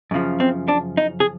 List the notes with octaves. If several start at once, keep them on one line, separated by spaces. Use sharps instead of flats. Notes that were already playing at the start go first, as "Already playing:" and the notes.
F#2 C#3 F3
C4
D4
D#4
G#4